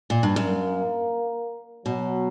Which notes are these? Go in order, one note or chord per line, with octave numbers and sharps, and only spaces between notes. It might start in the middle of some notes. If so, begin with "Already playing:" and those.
A#2
G2
F#2 A#3
B2 F#3